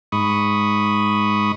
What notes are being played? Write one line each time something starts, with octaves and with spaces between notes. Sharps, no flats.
G#2 B5 C#6 D#6